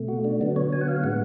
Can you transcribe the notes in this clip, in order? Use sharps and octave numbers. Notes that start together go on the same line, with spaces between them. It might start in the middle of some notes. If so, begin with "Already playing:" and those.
Already playing: B2 A3
F#4
D4
D3 F#3 B3 D4
C#5
G#5
F#5
F5
A2 G#3 B3 F#5